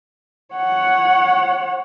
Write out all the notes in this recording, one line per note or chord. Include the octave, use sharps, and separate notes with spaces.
C#5 F#5